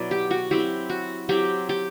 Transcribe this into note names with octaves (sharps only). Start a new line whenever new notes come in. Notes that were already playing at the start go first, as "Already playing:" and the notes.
Already playing: B2 F#3 B3 E4 D5
G4
F#4
F#3 C4 E4 G4
F#4
F#3 C4 E4 G4
G4